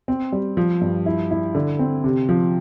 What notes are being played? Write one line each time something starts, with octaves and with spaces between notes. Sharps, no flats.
C4
G3
F3
G2
E4
E4
D3
C4
C3
F3